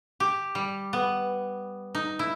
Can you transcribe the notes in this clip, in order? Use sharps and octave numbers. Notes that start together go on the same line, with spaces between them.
G4
G3
B3
D#4
E4